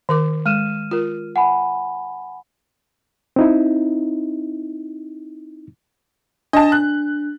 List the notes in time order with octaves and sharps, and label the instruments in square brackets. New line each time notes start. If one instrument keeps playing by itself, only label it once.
[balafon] D#3 A#4 D6
[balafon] G#3 [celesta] F6 D#7 E7
[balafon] F4 A#4
[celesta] F#5 G#5 B5
[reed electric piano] C4 D#4 E4
[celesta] D4 [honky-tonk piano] D#5 A5
[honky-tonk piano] F#6